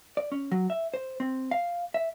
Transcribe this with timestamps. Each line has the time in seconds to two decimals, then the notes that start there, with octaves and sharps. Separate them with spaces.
0.17 D5
0.32 C#4
0.52 F#3
0.70 E5
0.94 C5
1.20 C4
1.51 F5
1.94 E5